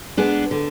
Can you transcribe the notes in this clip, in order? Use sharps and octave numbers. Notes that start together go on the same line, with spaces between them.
G#3 B3 D4 G#4
D3